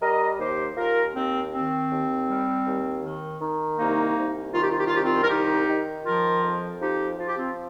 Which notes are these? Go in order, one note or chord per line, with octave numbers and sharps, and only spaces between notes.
G3 A#4 D#5
D#2 G4 C5
D#2 F4 A#4
D#2 C4
D#3 C4
D#2
G3
D#2
D#3
D#3
C2 A#3 D#4
C2
D#3 F4
G4
F4
G4
F4
C2 G4
C4 F4
A#4
D#3 D#4 G4
D#3
F3 F4 A#4
F2
F3 D#4 G4
F3 F4
G4
C4 F4